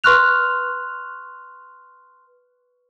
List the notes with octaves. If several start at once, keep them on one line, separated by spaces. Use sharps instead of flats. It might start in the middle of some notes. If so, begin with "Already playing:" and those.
B4 C6 C#6 F6 F#6 F7